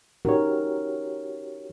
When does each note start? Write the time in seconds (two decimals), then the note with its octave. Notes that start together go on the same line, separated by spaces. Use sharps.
0.25 C#4 D#4 F#4 G4 A#4 C#5